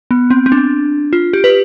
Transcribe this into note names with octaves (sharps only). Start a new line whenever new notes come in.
B3
C4
C4
D4
F4
G4
B4